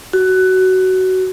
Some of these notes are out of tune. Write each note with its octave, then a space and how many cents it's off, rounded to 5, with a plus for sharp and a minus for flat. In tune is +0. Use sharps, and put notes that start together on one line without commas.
F#4 +15